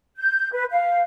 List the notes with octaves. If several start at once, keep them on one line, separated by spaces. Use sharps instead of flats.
G6
B4
F5